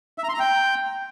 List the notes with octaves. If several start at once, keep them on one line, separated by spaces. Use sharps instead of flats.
E5
A#5
C6
A#5
G5